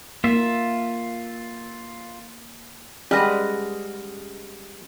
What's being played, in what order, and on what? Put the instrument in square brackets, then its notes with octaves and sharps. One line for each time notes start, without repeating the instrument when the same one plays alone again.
[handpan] A#3 [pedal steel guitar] F4 E5
[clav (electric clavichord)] G3 [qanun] G#3 B4 [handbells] C#4 F6 A#6